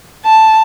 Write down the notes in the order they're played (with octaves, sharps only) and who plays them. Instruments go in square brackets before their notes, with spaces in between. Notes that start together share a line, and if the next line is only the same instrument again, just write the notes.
[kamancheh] A5